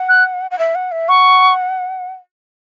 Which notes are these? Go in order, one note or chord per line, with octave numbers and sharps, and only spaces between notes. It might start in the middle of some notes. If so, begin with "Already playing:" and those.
Already playing: F#5
F#6
F#5
E5
F#5
E5
F#5 C#6